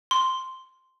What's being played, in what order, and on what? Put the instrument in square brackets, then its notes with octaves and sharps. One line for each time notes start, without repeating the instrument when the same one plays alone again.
[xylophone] C6